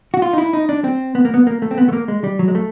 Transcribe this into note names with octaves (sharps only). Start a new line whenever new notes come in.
F#4
F4
D#4
E4
D#4
D4
C4
B3
A#3
B3
A#3
A3
C4
B3
A3
A#3
G#3
G3
F#3
G#3
A3